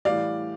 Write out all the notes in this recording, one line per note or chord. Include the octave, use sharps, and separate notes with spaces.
A2 E3 G3 D5 F5